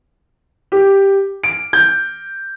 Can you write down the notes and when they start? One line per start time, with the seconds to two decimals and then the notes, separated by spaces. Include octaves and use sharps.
0.72 G4
1.44 D7
1.73 G6